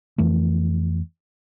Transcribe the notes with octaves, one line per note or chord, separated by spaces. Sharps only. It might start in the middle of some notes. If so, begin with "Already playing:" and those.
F2 E3 A3